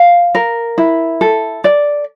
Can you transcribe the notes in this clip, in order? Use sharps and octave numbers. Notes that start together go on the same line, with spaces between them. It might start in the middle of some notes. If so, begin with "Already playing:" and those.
Already playing: F5
A#4
E4
A4
D5